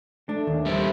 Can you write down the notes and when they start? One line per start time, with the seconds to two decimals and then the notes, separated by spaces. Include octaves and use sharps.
0.29 A3 D4
0.47 D#2 D#3
0.66 E2 G3 C5 E5